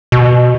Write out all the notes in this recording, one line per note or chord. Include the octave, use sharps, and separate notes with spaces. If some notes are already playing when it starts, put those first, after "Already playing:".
B2